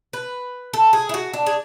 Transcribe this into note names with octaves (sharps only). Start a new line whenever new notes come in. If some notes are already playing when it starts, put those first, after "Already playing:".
B4
A4
G#4
E4
F#4
D4
G#4